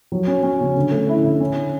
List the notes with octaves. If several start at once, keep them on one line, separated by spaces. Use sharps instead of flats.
F#3
C#4
C#4
C#3
D3
A3
E4
D3
C#4